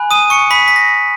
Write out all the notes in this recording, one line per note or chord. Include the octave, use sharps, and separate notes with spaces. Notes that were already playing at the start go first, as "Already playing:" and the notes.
Already playing: G#5 B5 F#6
D#6 D#7
C#6 C#7
B5 B6
B6
A#6